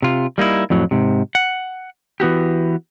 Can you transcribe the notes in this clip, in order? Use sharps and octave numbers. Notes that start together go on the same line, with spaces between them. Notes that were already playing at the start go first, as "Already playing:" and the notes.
C3 F4
G3 A#3 D#4 E4
F2 A2 F#3
G#2 C3
F#5
E3 B3 F#4 G4